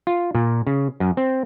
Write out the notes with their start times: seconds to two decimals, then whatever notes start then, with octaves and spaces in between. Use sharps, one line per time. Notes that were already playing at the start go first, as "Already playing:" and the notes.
0.07 F4
0.35 A#2
0.67 C#3
1.00 F#2
1.17 C4